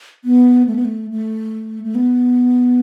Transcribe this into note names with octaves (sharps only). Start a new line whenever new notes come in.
B3
A3
B3
A3
A3
A3
B3